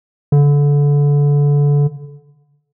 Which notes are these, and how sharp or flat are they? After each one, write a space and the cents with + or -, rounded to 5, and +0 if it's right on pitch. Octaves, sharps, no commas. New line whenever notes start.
D3 -25